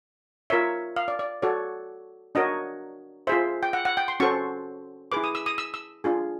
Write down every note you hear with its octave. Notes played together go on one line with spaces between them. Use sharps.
F4 A#4 C#5 E5
F5
D5
D5
F#4 A4 C#5 D5
D4 F#4 A#4 C#5 D#5
F4 G#4 C5 E5
G5
F#5
F#5
G5
C6
C#4 F#4 A4 C5 C#6
E4 G#4 B4 D6
D#6
E6
D#6
E6
E6
D4 F4 G#4